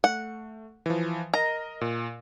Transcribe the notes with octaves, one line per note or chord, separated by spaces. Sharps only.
A3 F#5
E3 F3
A#4 D#5 A#5
A#2